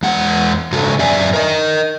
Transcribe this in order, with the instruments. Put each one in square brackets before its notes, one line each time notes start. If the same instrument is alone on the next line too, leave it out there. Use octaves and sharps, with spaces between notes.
[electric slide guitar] E2 G#3 F#5
G#2 C#3 G#3 F#4 A4
F#2 D5 E5 G#5
A#4 D#5